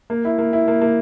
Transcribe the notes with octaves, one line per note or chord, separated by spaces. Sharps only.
A#3
E4
A#3
E4
A#3
A#3